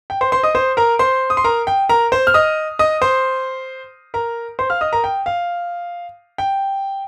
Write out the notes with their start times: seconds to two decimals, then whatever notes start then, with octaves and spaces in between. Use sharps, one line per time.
0.10 G5
0.21 C5 C6
0.32 C5 C6
0.43 D#5 D#6
0.55 C5 C6
0.77 A#4 A#5
0.99 C5 C6
1.30 D#6
1.37 C6
1.44 A#4 A#5
1.67 G5
1.89 A#4 A#5
2.12 C5 C6
2.27 F6
2.34 D#5 D#6
2.79 D#5 D#6
3.02 C5 C6
4.14 A#4 A#5
4.59 C5 C6
4.70 F5 F6
4.81 D#5 D#6
4.93 A#4 A#5
5.04 G5
5.26 F5
6.38 G5